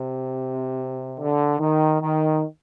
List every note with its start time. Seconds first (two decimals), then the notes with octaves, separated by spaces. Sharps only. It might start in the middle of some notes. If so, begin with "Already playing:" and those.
Already playing: C3
1.19 D3
1.60 D#3
2.01 D#3